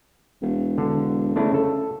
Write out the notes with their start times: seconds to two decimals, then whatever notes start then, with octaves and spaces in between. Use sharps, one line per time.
0.42 E1
0.78 D3
1.36 C#3 A3 D4 E4
1.54 A4